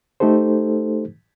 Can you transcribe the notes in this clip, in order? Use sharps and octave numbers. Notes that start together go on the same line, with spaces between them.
A3 D#4 G4 A4 C5